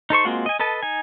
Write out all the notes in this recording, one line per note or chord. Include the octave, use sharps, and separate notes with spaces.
D#4 A4 C5 C#6
G#3 A#3 C4 F4 F#4
D#5 G#5
A4 B4 D#5 A5
D#4 G#5